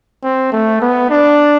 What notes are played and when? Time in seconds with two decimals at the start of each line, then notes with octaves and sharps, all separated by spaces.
0.23 C4
0.52 A3
0.81 B3
1.10 D4